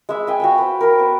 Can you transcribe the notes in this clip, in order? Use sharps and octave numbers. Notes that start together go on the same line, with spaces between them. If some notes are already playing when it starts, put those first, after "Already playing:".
G#3 B4 E5
E5 G5 G#5
F#4 F5 G5
B4 C5
A#4 B4
B3 C5